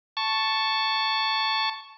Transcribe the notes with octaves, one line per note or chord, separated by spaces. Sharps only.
A5 C#6